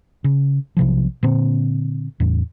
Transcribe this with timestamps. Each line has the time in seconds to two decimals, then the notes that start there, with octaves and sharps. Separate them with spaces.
0.24 C#3
0.77 B1 C3 F3
1.23 A#2 D3 C4
2.20 E2 A2